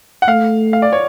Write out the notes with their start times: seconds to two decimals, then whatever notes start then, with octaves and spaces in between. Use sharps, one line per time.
0.22 F#5
0.28 A3 F5
0.73 F5
0.82 D5
0.93 C#5